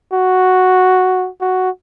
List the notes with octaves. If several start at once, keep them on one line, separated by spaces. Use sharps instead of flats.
F#4
F#4